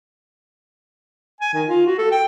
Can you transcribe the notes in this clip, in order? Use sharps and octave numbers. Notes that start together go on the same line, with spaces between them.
G#5
D#3
F4
F#4
A4
G5